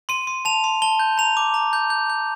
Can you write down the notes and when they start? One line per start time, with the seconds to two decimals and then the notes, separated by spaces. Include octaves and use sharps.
0.09 C6 D#7
0.27 C6
0.45 A5 F7
0.64 C6
0.82 A5 G7
0.99 G6
1.18 A#5 F7
1.37 D6
1.54 A#5
1.73 G6
1.90 G6
2.10 G6